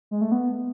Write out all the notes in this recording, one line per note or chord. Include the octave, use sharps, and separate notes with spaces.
G#3
A3
B3